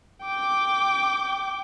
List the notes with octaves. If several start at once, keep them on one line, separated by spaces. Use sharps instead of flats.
G5 D6